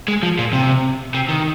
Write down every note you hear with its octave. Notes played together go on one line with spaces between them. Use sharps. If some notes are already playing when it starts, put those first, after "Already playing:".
G#3
F3
A#2
C3
C3
D#3